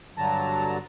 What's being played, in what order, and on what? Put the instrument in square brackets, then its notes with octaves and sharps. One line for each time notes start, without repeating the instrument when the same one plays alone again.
[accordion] G2 D3 F#3 A5 A#5